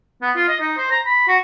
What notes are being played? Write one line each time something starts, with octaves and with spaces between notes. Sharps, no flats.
B3
F4
D#5
D#4
C5
A#5
B5
F#4